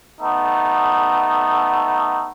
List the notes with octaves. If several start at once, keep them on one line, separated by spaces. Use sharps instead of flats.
A3 B3 D#4